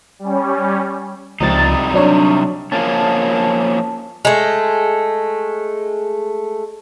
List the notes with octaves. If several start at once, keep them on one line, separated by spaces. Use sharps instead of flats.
G3 C#4
C#2 C3 F3 G3 D#4 A6
F#3 D4 C#5
F3 A#3 C#4 A5
G#3 A3